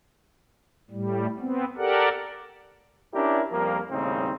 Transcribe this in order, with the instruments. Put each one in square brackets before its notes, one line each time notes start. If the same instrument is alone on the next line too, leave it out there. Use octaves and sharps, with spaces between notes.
[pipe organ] A2 G3
B3 C4
G4 A4 A#4 D5 F#5
[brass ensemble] C#4 D4 E4 G4 A#4 D5
F2 F3 G3 A#3
D#2 A2 C#3 G3 C4 D#4